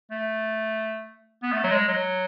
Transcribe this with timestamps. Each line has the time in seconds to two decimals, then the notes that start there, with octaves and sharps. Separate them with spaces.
0.11 A3
1.43 B3
1.52 A3
1.64 F#3
1.71 G#3
1.88 F#3